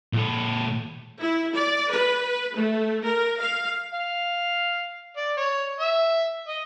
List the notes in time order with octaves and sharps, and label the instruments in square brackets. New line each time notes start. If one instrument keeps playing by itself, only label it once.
[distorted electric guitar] A#2 A4
[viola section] E4
D5
B4
A3
A#4
F5
[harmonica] F5
D5
C#5
E5
D#5